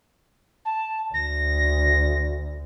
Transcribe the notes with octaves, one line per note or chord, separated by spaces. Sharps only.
A5
D2 A#6